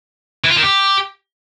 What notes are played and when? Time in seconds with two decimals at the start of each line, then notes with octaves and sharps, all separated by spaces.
0.44 E3
0.50 F4
0.57 D#3
0.63 G4